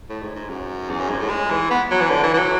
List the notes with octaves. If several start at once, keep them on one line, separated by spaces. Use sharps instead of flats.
A2
G#2
G#2
F#2
E2
F#2
G#2
A2
G#3
E3
B3
F#3
E3
D3
E3
E3
F#3